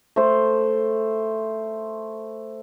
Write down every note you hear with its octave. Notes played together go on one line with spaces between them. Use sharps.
A3 C5